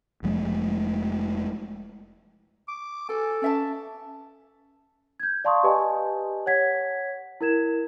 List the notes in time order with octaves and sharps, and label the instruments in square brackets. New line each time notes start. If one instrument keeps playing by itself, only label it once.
[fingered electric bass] F1 F3 G#3 A3
[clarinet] D6
[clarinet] A4 [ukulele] G#5
[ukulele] C#4 E5 A5
[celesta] G6 G#6
D5 F5 A5 C6 C#6 D#6
G4 B4 D#5 G#5 A5
C#5 F#5 G#6 B6
E4 A#4 G#6 E7